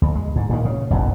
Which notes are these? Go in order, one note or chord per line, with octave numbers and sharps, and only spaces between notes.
D2
G#3
G#2
A#2 D#3
C#3
F#1 B1 F#2